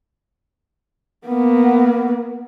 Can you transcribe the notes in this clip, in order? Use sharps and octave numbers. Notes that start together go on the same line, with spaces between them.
A#3 B3